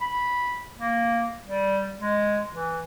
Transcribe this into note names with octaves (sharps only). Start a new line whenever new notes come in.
B5
A#3
G3
G#3
E3